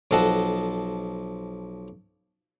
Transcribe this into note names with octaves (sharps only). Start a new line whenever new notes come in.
B1 F3 A4 D#5 F#5 A5